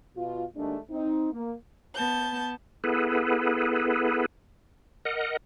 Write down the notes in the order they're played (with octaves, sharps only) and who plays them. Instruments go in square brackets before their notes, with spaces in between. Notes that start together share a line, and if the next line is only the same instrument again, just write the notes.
[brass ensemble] B2 F4
D#2 G#3 A3 D4
C4 D#4
A#3
[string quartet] B3 A5 G6
[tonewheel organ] B3 E4 G#4 A4 B4
A#4 D#5 F#5